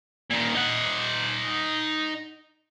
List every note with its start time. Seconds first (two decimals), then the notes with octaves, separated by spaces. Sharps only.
0.30 A#2 D#3
0.55 D#4 F#5